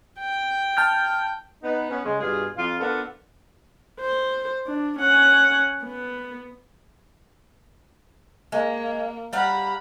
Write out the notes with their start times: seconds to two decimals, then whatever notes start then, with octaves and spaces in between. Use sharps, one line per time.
0.19 G5
0.77 A5 F6 G6
1.63 B3 D#4
1.90 B3 C#4
2.05 C#3 G#3
2.21 G2 B2 F4 G#4
2.57 F2 F4
2.80 B3 D4 F4 A4 A#4
4.00 C5
4.66 D4
4.99 C#4 F#5
5.83 B3
8.52 G#3 A#3
9.33 G3 F5 F#5 A#5 B5